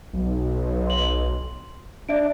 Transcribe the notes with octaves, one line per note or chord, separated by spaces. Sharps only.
B1
C6 F#7
D4 D5 E5 D7